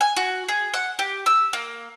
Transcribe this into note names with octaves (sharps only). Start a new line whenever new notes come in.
G#5
F#4
G#4
F#5
G4
E6
A#3